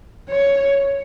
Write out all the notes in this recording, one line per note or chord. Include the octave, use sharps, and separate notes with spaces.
C#5